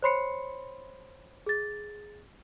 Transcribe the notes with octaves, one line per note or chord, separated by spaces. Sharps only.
C5 C#5 B5 C6 C7 C#7
G#4 A6